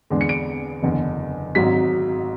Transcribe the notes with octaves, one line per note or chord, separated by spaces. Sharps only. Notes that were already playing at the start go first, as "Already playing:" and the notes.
E2 D3 G#3 D4
C#7
D7
F#1 E2 D3
G#1 G#2 F#3 B6